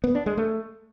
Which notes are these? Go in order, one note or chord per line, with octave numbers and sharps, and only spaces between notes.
B3
D4
G#3
A3